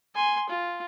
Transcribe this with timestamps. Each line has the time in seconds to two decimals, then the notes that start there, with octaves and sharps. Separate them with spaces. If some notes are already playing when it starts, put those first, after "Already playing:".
0.15 G#5 C6
0.49 F4